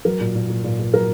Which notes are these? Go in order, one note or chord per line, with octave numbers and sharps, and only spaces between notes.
F#3 A#4
A#2
A#2
A#2
A#2
A#2
F#3 A#4